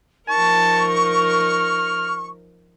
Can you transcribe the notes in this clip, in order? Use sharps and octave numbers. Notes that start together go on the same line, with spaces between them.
F3 D#4 A#4 A5 C#6
F6